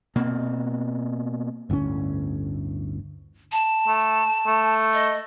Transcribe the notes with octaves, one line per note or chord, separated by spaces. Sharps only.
B2 A#3 C4
G1 D2 A2 C#4
A5
A3
A3
D#5